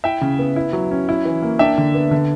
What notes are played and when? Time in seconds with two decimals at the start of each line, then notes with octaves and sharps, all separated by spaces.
0.04 E4 E5 G5
0.21 C#3
0.39 B3
0.56 E4
0.73 F#3
0.91 C#4
1.09 E4
1.25 E3
1.42 A#3
1.59 D4 E5 G5
1.78 D3
1.94 B3
2.11 D3